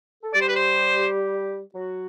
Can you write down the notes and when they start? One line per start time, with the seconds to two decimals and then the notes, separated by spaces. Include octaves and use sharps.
0.23 A4
0.34 G3 G4 D5
0.41 C5
0.48 B4
0.56 C5
1.74 F#3 F#4